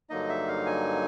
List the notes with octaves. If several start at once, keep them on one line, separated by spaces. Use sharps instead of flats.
G2 D3 F#3 A#3 D#4 D#5
E5
F5
G#5